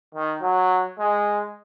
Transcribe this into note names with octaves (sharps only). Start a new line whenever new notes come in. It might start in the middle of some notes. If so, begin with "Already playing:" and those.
D#3
F#3
G#3